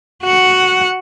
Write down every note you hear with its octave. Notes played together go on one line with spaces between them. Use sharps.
F#4 F#5